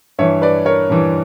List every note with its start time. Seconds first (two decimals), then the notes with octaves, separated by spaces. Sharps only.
0.19 G2 E3 C#5 E5
0.42 B4 D5
0.65 A#4 C#5
0.90 G2 E3